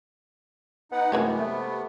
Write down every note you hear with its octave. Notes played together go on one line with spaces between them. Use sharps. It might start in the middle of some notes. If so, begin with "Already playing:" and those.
B3 D#4 F#5
F#2 C3 E3 G#3 A3 B3 G4 A#4
A3 A#3